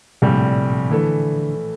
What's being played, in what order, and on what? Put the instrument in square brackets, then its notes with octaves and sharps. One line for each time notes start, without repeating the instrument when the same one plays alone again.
[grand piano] A#1 A2 G3 [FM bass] C3
[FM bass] D3 [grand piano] E3 A3